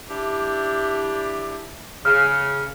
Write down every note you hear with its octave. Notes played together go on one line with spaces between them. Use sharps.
D4 E4 G4
C#3 F6